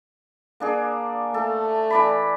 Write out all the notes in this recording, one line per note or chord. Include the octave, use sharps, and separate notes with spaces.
A#3 D4 G#4
A3 A4
E3 D5 B5